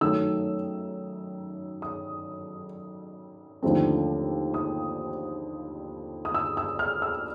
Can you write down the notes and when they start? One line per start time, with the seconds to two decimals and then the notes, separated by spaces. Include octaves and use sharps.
0.01 F#2 D#3 F#3 A3 E6
1.82 D#6
3.63 D#2 D3 F3 A3 C4
4.54 D#6
6.25 D#6
6.34 E6
6.57 E6
6.79 F6
7.02 E6